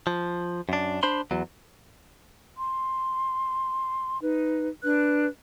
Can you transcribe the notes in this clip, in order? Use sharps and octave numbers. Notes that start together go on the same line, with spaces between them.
F3
F#2 D4
D4 C5 B5 C6
E2 F#3
C6
D#4 B4
D4 B4 F#6